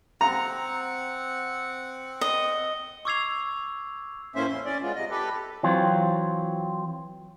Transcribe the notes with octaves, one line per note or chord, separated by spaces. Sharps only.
C4 F#5 A#5
D#5
C#6 D6 E6 G#6 C7 F7
A2 E3 A#3 C#4 C5 E5
F2 C6
C#4 D5
G#3 B3 F4
C3 D#5
G4 A4 B4
E3 F#3 C4 F4